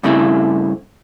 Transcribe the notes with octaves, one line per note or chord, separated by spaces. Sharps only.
G2 C#3 A3 C4 E4